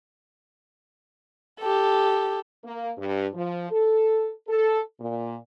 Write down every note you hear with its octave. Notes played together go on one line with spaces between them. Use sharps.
G4 A4
A#3
G2
F3
A4
A4
A#2